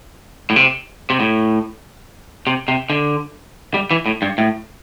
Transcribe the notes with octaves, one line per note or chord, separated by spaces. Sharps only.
A2
C3
C3
A2
C3
C3
D3
G3
E3
A2
G2
A2